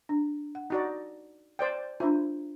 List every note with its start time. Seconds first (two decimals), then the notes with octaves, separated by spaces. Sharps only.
0.09 D4
0.55 F#5
0.70 D#4 F#4 D5
1.59 C5 D5 G5
2.00 D4 E4 F4 C5